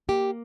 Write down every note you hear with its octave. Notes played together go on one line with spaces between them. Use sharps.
A#3 G4